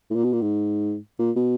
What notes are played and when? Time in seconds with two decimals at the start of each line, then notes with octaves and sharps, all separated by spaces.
0.11 A2
0.16 A#2
0.24 B2
0.33 A#2
0.42 G#2
1.19 A#2
1.36 B2